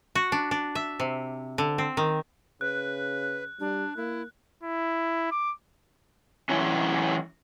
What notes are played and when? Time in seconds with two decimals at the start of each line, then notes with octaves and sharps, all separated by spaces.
0.15 F#4
0.32 D4
0.51 D4
0.75 E5
1.00 C3
1.58 D3
1.78 C4
1.97 D#3
2.61 C#3 B4 F#6
3.60 G3 D4
3.96 A#3 E4
4.63 E4
5.31 D6
6.49 E3 F#3 C#4